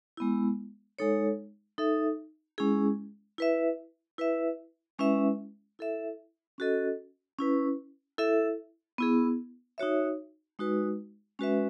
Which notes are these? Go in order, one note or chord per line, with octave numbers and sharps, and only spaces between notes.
G#3 B3 E4
G#3 D#4 A4 C#5
D#4 A4 E5
G#3 C#4 E4 G#4
E4 B4 E5
E4 B4 E5
G#3 C#4 E4 B4 E5
E4 A4 E5
C#4 F#4 A4 D#5
C#4 E4 B4
E4 A4 E5
B3 E4 G#4
D#4 F#4 C#5 E5
G#3 D#4 F#4 B4
G#3 C#4 F#4 B4 E5